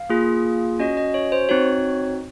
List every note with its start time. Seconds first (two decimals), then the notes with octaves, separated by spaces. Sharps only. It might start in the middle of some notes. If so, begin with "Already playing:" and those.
Already playing: F5
0.09 A#3 F4 G#4
0.79 C#4 F#4 D#5
0.97 D#5
1.14 C#5
1.32 C5
1.49 C4 D#4 F#4 C#5